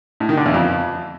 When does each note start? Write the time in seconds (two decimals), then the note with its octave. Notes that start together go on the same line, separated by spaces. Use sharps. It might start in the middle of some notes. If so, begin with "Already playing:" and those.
0.20 A2
0.29 D#3
0.37 D3
0.46 E2
0.54 F2